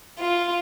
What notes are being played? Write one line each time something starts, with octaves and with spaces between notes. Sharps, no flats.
F4